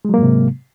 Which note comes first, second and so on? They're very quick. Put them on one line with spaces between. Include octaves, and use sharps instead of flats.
G#3 F#3 A#3 G#2 C3